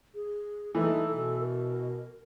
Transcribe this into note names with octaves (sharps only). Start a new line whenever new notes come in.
G#4
E3 A3 D#4 A4
B2 A4
A#4